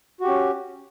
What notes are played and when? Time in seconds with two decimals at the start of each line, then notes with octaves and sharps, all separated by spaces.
0.21 F#4
0.24 G4
0.28 C#4